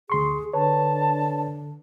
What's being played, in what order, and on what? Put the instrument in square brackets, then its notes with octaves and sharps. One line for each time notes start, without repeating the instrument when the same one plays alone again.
[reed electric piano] D2 C6 C#6 [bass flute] G#4
[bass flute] D3 [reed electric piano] B4 C#5 [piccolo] A5